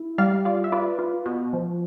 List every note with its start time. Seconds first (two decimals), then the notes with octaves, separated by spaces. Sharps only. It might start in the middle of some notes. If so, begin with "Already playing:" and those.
Already playing: E4
0.18 G3 D5 F5
0.45 F4 D5 F5
0.64 E5
0.72 F4 B4 D5
0.99 F4
1.26 B2
1.53 F3